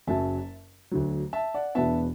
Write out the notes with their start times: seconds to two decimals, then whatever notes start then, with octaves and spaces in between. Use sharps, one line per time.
0.07 F#1 F#2 F#3 E5 A5
0.91 D2 D3 F#3
1.33 E5 A5
1.54 D5 F#5
1.75 E1 E2 B2 B3 D4 E5 A5